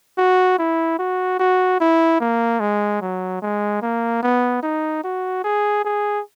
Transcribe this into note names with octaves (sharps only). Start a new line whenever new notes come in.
F#4
E4
F#4
F#4
E4
A#3
G#3
F#3
G#3
A#3
B3
D#4
F#4
G#4
G#4